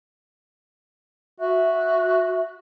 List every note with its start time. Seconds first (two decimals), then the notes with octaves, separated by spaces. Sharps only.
1.40 F#4 E5